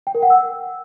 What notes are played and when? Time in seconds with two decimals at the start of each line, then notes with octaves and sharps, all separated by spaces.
0.07 G5
0.15 A#4
0.22 F#5
0.30 E6